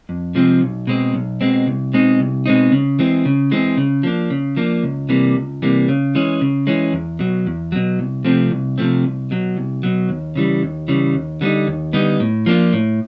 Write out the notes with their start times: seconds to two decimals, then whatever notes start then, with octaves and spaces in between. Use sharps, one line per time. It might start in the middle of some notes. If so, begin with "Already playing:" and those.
0.09 F2
0.35 C3 F3 G#3 C4
0.61 B1
0.87 B2 G#3 C4
1.14 B1
1.41 B2 G#3 C4
1.67 C2
1.93 B2 G#3 C4 D#4
2.20 C2
2.46 B2 G#3 C4 D#4
2.72 C#3
2.99 E3 G#3 C4
3.25 C#3
3.51 E3 G#3 C4
3.77 C#3
4.03 F3 A#3 D4
4.30 C#3
4.57 F3 A#3 D4
4.83 C#2
5.09 C3 E3 G3 A#3
5.35 C#2
5.62 C3 E3 G3 A#3
5.89 C#3
6.15 E3 G#3 C#4
6.41 C#3
6.67 E3 G#3 C#4
6.93 E2
7.19 B2 F#3
7.47 E2
7.72 B2 F#3
7.99 C2
8.24 C3 F3 A3 C4
8.51 C2
8.78 C3 F3 A3 C4
9.04 C2
9.31 B2 F#3
9.57 C2
9.83 B2 F#3
10.09 D#2
10.36 C#3 E3 G3
10.63 D#2
10.88 C#3 E3 G3
11.14 D#2
11.41 D3 G3 B3 D#4
11.67 D#2
11.93 D3 G3 B3 D#4
12.20 A2
12.46 F3 A#3 D4 F4
12.73 A2